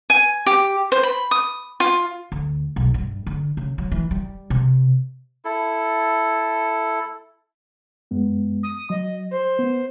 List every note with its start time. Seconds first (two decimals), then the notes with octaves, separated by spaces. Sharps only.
0.10 G#5
0.46 G4
0.92 C5
1.03 B5
1.31 D#6
1.80 F4
2.32 D2
2.76 B1
2.94 G2
3.27 D3
3.57 C#3
3.78 F#3
3.92 E3
4.11 G3
4.50 C3
5.45 E4 A4
8.11 F#2 G#3 B3
8.63 D#6
8.90 F#3 D#5
9.31 C5
9.59 B3